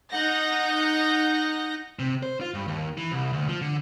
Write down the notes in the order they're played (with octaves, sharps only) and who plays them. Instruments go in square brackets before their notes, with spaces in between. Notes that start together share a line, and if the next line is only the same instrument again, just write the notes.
[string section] D#4 F#5 G6 A#6
[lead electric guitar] C3
C5
F4
G2
D#2
E3
C2
D2
F3
D3